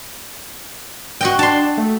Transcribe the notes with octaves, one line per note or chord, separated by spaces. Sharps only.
F#4 D#5 G5
D4 A5 C6
A3